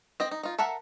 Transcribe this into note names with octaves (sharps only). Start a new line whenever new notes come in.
C4 D#5 G5
D#4
D#4 F4
A4 A#4 E5 F#5